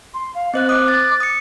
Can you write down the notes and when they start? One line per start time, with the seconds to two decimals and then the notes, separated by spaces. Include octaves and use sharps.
0.14 C6
0.35 F5
0.54 C4 C5 D#5 F#6
0.69 D6 D#6 F#6
0.88 A6
1.20 D#6 C#7